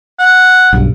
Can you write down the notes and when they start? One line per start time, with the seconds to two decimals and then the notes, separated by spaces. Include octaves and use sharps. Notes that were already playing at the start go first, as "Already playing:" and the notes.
0.19 F#5
0.73 B1 G2